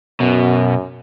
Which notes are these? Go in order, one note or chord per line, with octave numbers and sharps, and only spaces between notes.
F#2 B2